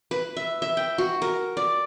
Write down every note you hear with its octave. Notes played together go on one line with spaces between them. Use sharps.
B4
E5
E5
G5
F#4
A#4
D5